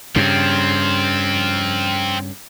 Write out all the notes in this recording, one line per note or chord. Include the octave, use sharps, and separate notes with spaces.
G2 C#3 C4 F4